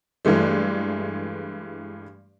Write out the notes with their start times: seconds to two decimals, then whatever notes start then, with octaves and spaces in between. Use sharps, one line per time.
0.25 G2 E3 G#3 A3